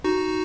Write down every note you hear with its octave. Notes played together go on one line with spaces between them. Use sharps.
D#4 F#4